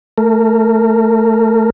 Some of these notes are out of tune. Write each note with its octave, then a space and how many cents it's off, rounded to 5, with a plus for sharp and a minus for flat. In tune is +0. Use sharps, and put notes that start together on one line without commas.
A3 +0 A#4 -20